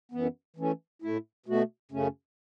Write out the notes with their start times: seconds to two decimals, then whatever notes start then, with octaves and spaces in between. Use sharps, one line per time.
0.12 F#2 E3 B3
0.56 E3 A3 C#4
1.02 A2 A3 E4
1.46 B2 A3 F#4
1.91 F#2 C#3 A3 C#4